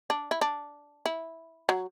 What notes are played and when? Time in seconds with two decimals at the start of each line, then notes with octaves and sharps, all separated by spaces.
0.10 D4
0.31 E4
0.41 D4
1.06 E4
1.69 F#3